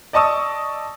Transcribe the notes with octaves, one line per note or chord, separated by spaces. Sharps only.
D5 D#5 A5 C#6 D#6 E6